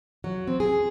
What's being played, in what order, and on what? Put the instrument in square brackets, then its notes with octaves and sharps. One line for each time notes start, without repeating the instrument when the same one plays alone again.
[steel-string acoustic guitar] F#3
C4
G#4